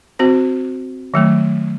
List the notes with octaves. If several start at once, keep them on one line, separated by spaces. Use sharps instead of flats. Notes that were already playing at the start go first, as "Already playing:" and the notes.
C4 F#4 C5
D#3 F#3 A3